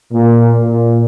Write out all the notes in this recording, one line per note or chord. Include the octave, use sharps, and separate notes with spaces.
A#2
A#2